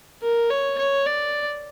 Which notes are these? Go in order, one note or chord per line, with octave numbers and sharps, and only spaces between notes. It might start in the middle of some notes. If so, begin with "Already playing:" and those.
A#4
C#5
C#5
D5